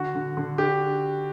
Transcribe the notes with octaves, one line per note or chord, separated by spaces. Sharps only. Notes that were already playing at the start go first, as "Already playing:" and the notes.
Already playing: D3 F#4
D3
D3
D4 G4